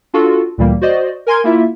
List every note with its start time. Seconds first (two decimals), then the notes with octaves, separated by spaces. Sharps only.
0.14 D4 F4 F#4 A4
0.58 D2 A#2 E3 G3 A#3
0.81 F#4 C5 D5 D#5
1.27 A#4 G#5 C6 G#6
1.44 A#3 E4 F4 E5